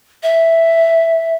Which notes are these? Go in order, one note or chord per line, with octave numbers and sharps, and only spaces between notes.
E5